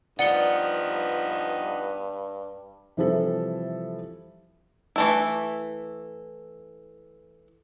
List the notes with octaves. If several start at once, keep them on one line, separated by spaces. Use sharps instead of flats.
G2 F3 B3 D#4 D5 F#5 C#7 G7
C3 E3 F3 G3 E4 A4
E3 A3 E4